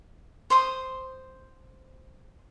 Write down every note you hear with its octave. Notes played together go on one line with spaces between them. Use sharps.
C5 C6 D#6